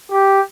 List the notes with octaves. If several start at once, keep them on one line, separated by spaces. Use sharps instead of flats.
G4